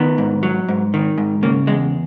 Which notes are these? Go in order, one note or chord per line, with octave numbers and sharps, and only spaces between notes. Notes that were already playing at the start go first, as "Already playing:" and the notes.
Already playing: D#3 B3
G#2
F#3
G#2
D#3
G#2
C#3 A#3
E2 G#3